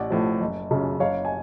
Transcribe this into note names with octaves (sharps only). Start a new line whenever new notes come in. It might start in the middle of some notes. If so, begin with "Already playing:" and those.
Already playing: A1 D5 F#5
A2 F3
F#1
F#2 C#3
F#1 C#5 F5
G#5